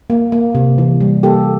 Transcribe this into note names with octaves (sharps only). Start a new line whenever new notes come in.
A#3
A#3
C3
E3
G3
A#3 G4 A4